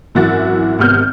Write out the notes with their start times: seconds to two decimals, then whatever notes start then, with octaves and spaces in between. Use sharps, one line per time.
0.15 G#1 F#2 E3 E4 F#4 A6
0.79 G#1 C3 B3 F6 G6